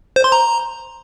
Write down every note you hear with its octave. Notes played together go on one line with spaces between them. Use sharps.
C5
C6
A#5